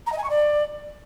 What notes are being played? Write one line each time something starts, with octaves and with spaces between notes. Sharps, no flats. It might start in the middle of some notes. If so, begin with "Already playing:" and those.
A#5
D#5
G#5
C#6
D5